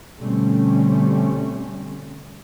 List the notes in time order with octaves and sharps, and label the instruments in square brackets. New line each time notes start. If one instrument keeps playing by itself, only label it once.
[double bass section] B2 D3 G3 A3 C4 C#4